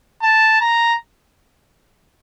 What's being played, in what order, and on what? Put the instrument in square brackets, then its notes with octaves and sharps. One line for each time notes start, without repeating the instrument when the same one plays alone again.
[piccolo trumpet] A5
A#5